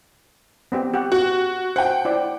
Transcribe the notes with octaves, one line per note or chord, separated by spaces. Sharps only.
B3 C4 G4
G4 F#5
F#4
C5 F#5 G5
E4 C5 D5